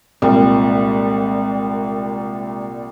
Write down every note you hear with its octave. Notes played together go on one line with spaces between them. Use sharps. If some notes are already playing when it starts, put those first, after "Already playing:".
C2 A#2 G3 G#3 A#3 C4